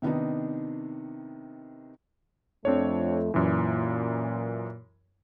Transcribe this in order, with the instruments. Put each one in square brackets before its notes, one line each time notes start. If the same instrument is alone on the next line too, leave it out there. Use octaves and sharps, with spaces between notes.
[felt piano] C3 D#3 B3 D4 D#4
[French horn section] F2 A3 [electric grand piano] C4 D4 C#5
[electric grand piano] F#2 E3 [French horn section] A#2